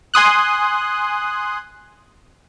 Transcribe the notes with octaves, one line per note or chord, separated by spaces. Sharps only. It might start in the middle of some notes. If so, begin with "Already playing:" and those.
G#5 C6 D#6 F#6